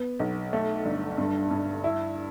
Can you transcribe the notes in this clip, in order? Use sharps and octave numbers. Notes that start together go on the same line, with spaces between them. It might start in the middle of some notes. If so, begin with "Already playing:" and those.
Already playing: B3
B1
A3
G1
G2
G2
E4